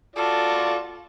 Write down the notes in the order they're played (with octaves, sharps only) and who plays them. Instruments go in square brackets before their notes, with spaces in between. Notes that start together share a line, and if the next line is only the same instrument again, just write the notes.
[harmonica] F4 F#4 D5 [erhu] A4